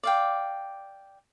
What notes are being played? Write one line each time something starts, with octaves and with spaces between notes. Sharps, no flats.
D5 F5 G5